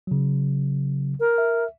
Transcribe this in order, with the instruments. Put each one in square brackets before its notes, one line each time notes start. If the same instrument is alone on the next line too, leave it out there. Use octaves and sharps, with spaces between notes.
[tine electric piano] C#3 F#3
[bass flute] A#4
[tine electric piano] E5